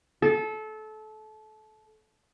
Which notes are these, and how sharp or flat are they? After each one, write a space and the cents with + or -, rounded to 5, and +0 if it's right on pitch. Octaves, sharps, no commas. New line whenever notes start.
A4 -25